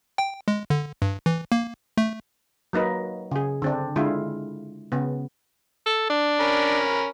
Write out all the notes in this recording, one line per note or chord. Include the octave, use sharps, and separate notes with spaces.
G5
G#3
D3
G2
E3
A#3
A3
F#3 A#3 D#4 B4
C#3 G#4
D3 C4 D4
D3 G#3 E4 F4
C#3 B3
A4
D4
C#4 A#4 B5